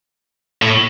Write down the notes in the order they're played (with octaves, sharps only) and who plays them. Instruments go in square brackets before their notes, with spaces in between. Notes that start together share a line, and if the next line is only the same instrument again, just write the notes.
[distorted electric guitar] A2